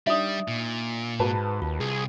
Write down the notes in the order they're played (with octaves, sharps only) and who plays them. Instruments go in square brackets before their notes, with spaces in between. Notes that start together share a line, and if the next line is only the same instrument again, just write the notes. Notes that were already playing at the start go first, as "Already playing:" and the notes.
[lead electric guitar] G3 [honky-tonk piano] D4 D#4 [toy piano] E5 D#6
[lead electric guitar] A#2
[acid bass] G#2 [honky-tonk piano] F#4 B4 A5
[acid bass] D#2 [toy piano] F4
[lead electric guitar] C2 [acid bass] G#4